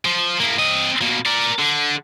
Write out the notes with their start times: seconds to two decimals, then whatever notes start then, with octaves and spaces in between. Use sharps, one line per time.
0.05 F3 C5
0.40 A#3 E4
0.59 C4 D#5
1.01 B2 A#3
1.26 A#4 D5
1.59 D3